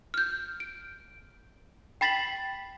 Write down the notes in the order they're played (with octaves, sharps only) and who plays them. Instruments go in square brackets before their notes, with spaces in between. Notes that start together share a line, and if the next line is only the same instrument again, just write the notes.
[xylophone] F6 G6
D7
G5 B5 A6 B6 C7 F#7